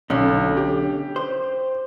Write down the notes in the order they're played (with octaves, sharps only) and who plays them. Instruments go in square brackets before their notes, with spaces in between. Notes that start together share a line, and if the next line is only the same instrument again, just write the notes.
[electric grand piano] B1 [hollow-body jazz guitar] D3 C#4
[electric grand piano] G4
[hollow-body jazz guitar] C5